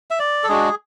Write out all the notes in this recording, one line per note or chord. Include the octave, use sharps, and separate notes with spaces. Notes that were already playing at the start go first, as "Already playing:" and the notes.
E5
D5
A4
G#3 D4 F#4 G#4